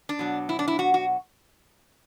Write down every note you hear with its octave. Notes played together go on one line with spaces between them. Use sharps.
D4
B2 F#3
E4
D4
E4
F#4
F#4